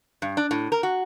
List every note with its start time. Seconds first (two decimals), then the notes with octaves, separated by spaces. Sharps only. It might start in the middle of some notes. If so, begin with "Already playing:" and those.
0.22 G2
0.37 D4
0.51 A2
0.72 A#4
0.83 F#4